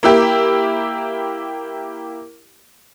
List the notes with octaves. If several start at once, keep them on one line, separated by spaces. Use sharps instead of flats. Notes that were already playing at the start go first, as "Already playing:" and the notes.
A#3 E4 G4